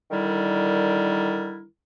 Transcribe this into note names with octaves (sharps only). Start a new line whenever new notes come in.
D3 D#3 G3 E4 A#4